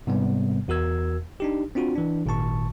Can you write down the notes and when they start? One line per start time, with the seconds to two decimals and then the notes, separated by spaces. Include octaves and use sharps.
0.07 G#2 C3 G3 B3
0.68 E2 F#4 A#4 E6 G#6
1.40 D4 D#4 G4
1.75 C4 D4 F4 F#4
1.95 E3 D4
2.26 G#1 A#2 D#3 A5 C#6